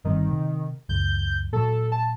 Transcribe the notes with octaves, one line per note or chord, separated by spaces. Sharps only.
G1 D#3 G3 C4
C3
C#2 F#2 G6
A#2 F#3 A4
A5